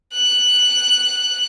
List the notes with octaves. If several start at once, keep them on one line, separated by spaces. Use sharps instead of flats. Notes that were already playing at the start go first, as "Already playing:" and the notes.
F#6